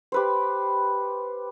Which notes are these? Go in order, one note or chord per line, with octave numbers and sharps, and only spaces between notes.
G4 B4 C5